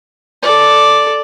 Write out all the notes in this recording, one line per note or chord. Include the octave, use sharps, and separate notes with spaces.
A4 D5